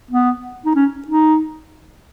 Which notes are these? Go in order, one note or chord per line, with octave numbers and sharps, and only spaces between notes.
B3
D#4
C#4
D#4